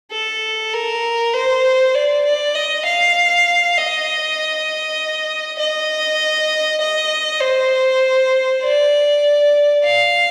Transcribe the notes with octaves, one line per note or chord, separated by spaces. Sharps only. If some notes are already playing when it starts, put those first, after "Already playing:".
A4
A#4
C5
D5
D5
D#5
F5
D#5
D#5
D#5
C5
D5
F5